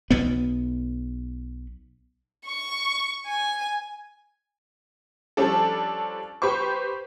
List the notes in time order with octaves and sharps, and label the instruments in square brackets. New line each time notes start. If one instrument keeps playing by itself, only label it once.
[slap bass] B1 B3
[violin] C#6
G#5
[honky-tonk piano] F3 G3 C#4 D4 A4
G4 B4 C5 C#6